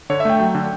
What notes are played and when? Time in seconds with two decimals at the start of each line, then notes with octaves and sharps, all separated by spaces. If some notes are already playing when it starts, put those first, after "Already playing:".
0.10 D3 C#5
0.20 E5
0.25 A3 G5
0.40 F#3 G5
0.55 D3